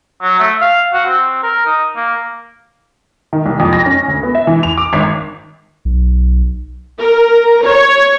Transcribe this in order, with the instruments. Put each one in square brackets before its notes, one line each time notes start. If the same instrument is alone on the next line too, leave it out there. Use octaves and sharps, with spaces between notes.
[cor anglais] F#3
A3
F5
F#4
C4
A#4
D#4
A#3
[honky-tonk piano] D#3
C2
F2
A#6
C#4
D2
B3
E5
E3
F7
D6
G#1
[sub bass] B1
[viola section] A#4
C#5